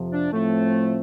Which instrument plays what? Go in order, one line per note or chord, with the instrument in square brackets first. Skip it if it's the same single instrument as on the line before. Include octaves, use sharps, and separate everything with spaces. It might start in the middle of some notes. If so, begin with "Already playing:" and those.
Already playing: [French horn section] F2 C3 F3
[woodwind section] D4
[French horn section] A2 F3 C4 [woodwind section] A3